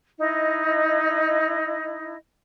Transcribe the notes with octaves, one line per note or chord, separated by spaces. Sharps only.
D#4 E4 D#5